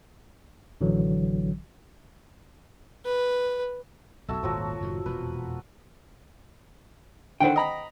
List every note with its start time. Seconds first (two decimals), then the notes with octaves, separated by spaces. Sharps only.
0.81 A1 D3 E3 F#3
3.05 B4
4.28 B1 F2 F#4 A4 E5
4.43 D#1 G#1 D#2 F3 F#3 F#4
4.81 F#1 A2 D#3
5.06 E1 F2 A#2 B4
7.40 D3 D#3 C5 F#5 G5
7.56 D#5 A#5 B5